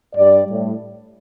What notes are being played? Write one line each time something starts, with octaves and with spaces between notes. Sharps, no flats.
G2 G3 D5
A2 G3